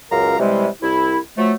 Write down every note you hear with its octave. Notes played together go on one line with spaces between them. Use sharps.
C#2 F#2 A#4 F5 A#5
C3 E3 G3 G#3
C2 E4
F3 F#3 A3